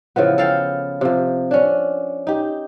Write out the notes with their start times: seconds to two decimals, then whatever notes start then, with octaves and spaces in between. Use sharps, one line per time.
0.16 C#3 E3 F3 B3
0.38 A4 F5 G5
1.01 C3 F3
1.51 C#4 D4
2.27 D#4 G4